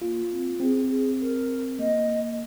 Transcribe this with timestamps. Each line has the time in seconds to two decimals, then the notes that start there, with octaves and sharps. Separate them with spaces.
0.01 A#3 F4
0.31 C4
0.60 C4 G#4
0.90 G#4
1.20 A#4
1.79 A#3 D#5